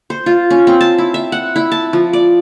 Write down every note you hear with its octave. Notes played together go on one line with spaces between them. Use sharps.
C5
F4
C#4
C4
A5
E4
E5
F#5
E4
A5
F3
D5